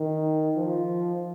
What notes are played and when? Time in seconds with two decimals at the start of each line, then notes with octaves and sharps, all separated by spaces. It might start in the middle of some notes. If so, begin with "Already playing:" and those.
Already playing: D#3
0.56 F3